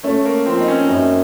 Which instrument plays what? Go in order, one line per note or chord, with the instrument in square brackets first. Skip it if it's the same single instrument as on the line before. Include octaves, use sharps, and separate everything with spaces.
[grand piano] A3 [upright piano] C#4
[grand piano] A#3
[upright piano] F3 [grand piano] C4
[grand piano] D#4
C#4
C#4
[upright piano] F#2 [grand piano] D#4